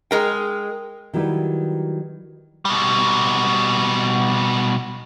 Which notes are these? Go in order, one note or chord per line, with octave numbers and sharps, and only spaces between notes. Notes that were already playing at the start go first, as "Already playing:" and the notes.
G#3 A#4 G5
D#3 F#3 G3 E4 B4
B2 G3